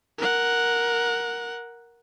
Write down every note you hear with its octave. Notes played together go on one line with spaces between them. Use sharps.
A#4 F#5